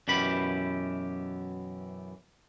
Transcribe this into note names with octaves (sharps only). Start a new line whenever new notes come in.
F#2 B2 E3 G4 B5